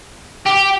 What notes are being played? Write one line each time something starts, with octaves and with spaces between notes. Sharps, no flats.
G4